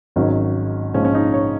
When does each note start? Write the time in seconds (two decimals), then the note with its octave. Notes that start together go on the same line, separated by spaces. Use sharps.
0.16 G#1 G#2 D#3 F#3 C#4
0.94 A#1 G#2 F3 G#3 C#4
1.05 C#4
1.14 D#4
1.34 C#5